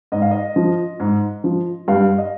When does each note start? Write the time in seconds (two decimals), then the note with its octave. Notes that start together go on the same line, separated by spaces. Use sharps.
0.12 G#2 D#5
0.22 F5
0.31 D#5
0.56 F3
1.00 G#2
1.44 F3
1.88 G2 F5
2.18 D#5